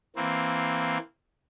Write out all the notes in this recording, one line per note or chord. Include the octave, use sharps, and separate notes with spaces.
E3 A#3 C4